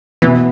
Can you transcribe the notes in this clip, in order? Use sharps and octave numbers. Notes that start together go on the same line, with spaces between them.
B2 E3 B3